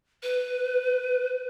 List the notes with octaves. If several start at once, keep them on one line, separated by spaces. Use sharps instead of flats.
B4